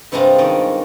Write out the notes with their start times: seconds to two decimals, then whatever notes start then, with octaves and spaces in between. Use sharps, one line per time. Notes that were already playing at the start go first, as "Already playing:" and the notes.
0.12 G2 C3 G3 G#3 D4 F4
0.38 D#3 C#4 D5